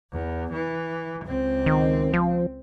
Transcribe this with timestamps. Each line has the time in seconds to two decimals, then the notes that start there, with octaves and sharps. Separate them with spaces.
0.12 E2
0.53 E3
1.25 C#2 C4
1.66 D#3
2.13 F3